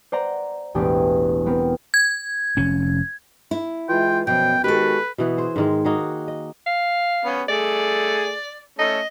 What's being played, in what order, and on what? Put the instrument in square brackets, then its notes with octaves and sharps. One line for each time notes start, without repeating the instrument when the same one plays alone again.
[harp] C5 D5 F#5 A#5 C6
E1 A1 E2 D4 G4 D5
B3 C4 A#4
[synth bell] G#6
[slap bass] F1 C#4
[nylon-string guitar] E4
[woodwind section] E3 G#3 F4 [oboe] G5
[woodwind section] F#2 F3 [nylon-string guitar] B2 [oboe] G5
[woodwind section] D#3 G#3 F#4 [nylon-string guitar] G4 A4 [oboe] B4
[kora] B2 E3 B3
G#4 C5
G#2 D#3 G#3
A#3 D#4 F#4 G#4
D#5
[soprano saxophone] F5
[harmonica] B3 C#4
[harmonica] A3 G#4 [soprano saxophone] D5
[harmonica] A3 C#4 A4 [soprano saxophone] D#5